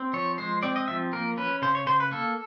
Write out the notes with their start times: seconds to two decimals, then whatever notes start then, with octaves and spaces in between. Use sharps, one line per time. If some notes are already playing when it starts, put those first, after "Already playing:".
Already playing: C4
0.13 F3 C#5
0.38 G#3 C5
0.63 C4 D5
0.76 D#5
0.88 F3 E5
1.13 A#3 A#4
1.37 C#4 B4
1.62 C#3 C5
1.75 C#5
1.86 C#3 C5
2.00 B4
2.11 A#3 A4